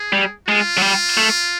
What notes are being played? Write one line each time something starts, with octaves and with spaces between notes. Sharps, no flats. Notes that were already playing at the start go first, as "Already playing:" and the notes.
Already playing: G#4
G3
G#3 F4
F#3
G3
A3